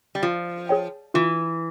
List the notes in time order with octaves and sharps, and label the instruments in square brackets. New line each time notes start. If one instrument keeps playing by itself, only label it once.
[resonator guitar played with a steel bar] G3
[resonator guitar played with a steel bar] F3 [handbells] F4
[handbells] G#4 C#5 G5
[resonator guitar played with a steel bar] E3 [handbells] F4